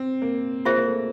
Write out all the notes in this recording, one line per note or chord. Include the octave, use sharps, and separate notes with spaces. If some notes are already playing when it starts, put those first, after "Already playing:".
Already playing: C4
A#3
A#3 F4 G#4 C5 E5
A#3
A3